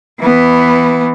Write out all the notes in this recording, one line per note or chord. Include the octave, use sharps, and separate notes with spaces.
E3 B3